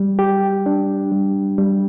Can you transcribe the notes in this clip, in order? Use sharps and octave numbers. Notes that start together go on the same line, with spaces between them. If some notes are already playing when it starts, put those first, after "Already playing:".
Already playing: G3
G4
D4
G3
G3